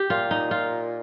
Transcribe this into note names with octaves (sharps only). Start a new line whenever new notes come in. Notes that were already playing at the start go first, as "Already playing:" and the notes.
Already playing: G4
A#2 F4
D#4
F4